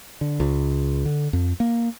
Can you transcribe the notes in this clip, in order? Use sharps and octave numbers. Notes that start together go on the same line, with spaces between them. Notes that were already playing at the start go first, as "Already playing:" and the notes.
D3
C#2
D3
F2
A#3